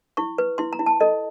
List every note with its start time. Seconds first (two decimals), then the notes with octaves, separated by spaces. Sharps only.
0.17 E4 C#6
0.38 B4
0.58 E4 C6
0.73 A#5
0.79 E4
0.86 A5
1.00 A4 D#5